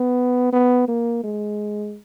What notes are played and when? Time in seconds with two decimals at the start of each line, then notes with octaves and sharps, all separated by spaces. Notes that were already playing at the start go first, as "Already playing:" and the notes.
Already playing: B3
0.52 B3
0.88 A#3
1.24 G#3